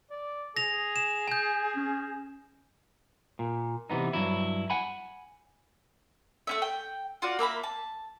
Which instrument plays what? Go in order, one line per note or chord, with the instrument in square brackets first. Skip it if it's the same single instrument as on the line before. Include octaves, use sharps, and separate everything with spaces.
[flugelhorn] D5
[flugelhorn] G#4 [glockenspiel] A#6 F7
[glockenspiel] E7
G#5 G6
[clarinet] C#4
[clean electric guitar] A#2
C3 E3 B3 D#4
G2 F#3 E4
F#5 G#5 B5
[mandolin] A3 C#4 E5
G5
F4 F#4 D5
A#3 E5 A#5 B5
A5